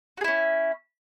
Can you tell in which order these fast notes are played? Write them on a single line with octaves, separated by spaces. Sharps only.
F#4 G#4 E4 C#4